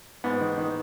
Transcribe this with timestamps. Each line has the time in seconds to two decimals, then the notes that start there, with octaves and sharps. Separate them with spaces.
0.24 G#2 B3
0.41 D#3
0.58 D#3